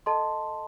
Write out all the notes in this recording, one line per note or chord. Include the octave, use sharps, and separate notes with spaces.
A4 D#5 A5 C6